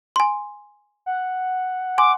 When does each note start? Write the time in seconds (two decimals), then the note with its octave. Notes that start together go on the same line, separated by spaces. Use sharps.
0.16 G#5 C6
1.06 F#5
1.98 G#5 C6 D6